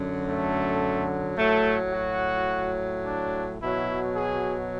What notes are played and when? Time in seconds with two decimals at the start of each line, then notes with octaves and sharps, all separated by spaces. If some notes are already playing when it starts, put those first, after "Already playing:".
Already playing: F#2 D3 F#3
0.26 A3
1.37 A2 F#3 A3
1.93 F#4
3.03 D4
3.59 B2 F#3 E4
4.15 G#4